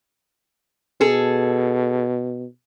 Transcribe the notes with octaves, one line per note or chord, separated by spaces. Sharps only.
B2 G#4 A4